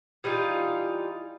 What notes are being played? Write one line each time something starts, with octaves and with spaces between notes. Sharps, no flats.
E3 G3 D#4 F4